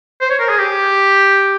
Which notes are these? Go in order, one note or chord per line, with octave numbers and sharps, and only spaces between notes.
C5
C#5
A#4
G#4
G4